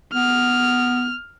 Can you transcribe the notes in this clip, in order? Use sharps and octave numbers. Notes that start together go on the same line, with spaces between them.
B3 F6